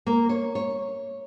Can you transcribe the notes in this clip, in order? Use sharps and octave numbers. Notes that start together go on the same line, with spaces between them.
A#3
C#5
C#5